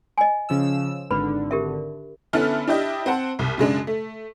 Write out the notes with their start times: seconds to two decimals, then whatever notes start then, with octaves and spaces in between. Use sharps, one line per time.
0.18 D#5 G#5
0.49 C#3 F3 E6
1.11 G#1 D3 B4 B5
1.51 G4 A#4 E5
2.33 D3 B3 C#4 E4 A4 F6
2.67 D4 E4 G4 D#5
3.06 C4 C5 F#5 A5
3.39 C2
3.58 F#2 C#3 G#3 D4
3.87 A3